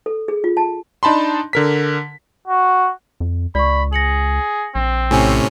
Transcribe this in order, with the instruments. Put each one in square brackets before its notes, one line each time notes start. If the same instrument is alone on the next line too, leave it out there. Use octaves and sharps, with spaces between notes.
[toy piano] A4
G#4
F4
A5
[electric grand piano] D4 D#4 A5 B5 C6
D3 A#4 B6
[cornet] F#4
[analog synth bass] F2
[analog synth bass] C#2 [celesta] D5 C#6 [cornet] B5
[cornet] G#4 [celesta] A#6 C#7 F#7
[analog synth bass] A#1 [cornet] C4
[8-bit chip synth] A2 C3 C#4 [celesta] G#5